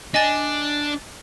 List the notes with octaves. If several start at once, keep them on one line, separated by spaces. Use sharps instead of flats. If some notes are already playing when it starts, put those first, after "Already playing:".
D4 D#5 G#5 A6